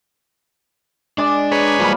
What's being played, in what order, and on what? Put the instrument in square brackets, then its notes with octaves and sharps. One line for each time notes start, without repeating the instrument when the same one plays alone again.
[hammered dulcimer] G#3 D5 [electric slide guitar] D4
[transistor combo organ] G#4 B4 C#5 [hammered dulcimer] A#5
[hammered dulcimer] F3 B5 [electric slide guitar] G3 A#3 F4